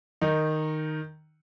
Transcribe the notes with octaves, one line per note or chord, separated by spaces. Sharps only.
D#3 D#4